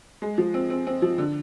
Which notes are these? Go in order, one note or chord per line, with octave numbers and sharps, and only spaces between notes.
G#3
F3
C4
C4
C4
F3
D3